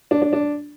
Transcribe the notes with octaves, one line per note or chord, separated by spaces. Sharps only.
D4
D4
D4